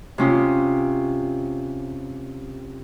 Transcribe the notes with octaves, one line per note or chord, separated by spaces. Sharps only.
C3 C#4 F4 D#6